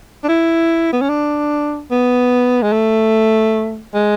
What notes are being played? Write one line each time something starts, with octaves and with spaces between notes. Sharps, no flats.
D4
E4
B3
C#4
D4
B3
G#3
A3
G#3